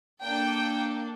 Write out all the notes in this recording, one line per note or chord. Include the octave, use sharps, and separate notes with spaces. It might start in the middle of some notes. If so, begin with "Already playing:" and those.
A#3 D4 A4 G5